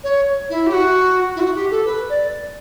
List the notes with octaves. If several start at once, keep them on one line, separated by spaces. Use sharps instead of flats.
C#5
E4
G4
F#4
E4
F#4
G4
A4
B4
D5